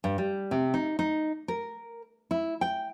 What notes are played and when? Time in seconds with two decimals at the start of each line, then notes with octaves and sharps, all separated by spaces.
0.04 G2
0.18 G3
0.51 C3
0.74 D#4
0.99 D#4
1.48 A#4
2.31 E4
2.61 G5